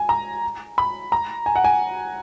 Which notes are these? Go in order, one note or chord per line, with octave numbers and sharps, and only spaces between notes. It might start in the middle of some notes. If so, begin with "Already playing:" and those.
Already playing: G#5
A#5
B5
A#5
G#5
F#5
G#5